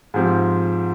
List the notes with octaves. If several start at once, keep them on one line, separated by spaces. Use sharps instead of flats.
G#2 F3 C4 G4